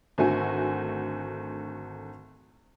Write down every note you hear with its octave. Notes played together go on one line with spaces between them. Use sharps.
G#1 D3 A3 F#4 G#5